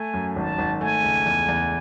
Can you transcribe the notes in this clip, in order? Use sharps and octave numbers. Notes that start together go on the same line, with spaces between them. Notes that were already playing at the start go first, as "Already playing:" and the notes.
Already playing: A3 G#5
F#2
G#1 A5
G#1
A3 G#5
C#2
E2
E2